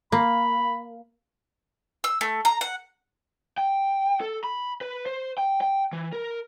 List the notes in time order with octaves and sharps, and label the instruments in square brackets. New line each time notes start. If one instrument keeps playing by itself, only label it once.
[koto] A#3 [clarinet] B5
[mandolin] E6
A3
A#5
F#5
[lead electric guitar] G5
A4
B5
B4
C5
G5
G5
E3
A#4